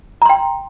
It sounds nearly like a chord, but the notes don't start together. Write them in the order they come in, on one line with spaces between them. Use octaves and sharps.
A#5 C6 G5